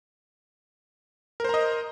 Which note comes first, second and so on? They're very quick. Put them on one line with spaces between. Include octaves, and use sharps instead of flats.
A#4 C5 A#5 D#5